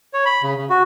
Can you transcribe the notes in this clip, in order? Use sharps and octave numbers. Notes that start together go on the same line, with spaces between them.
C#5
B5
C#3
C#3
F#4